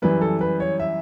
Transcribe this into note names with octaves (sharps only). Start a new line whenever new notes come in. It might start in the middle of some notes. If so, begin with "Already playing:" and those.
F#2 E3 G3 B4
A4
B4
C#5
E5